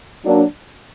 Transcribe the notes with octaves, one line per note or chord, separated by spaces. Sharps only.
F#3 A#3 D4